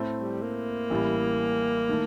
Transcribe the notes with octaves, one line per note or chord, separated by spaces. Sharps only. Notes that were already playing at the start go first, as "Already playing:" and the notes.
Already playing: A2 A3 C4
G3
A#3
A1 A2 G3
D#3 A3